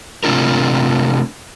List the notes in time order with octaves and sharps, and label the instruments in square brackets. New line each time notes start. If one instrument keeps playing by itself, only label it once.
[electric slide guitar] C3 A3 C4 D4 F4 A#4